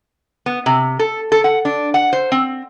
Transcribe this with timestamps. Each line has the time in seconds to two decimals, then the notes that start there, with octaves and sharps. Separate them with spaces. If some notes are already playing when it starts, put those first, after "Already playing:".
0.46 B3
0.66 C3
0.99 A4
1.32 A4
1.44 F#5
1.65 D4
1.94 F#5
2.13 C5
2.32 C4